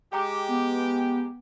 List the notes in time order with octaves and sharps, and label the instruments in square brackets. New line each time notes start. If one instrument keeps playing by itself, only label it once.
[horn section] G#3 G4 [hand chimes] G5 A#5 D6
[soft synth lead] B3